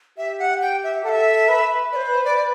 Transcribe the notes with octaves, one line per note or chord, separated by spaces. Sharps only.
G4 E5
F#5
G5
E5
A4 F#5
E5
B4
D5
C5
D5
D5